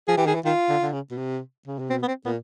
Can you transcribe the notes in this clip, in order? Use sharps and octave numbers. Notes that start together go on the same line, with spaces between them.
F3 G#4
E3 G4
D#3 G#4
E3
D#3 F4
D3
D3
C#3
B2
C3
C#3
C3
B2 C4
B3
C4
A#2 B3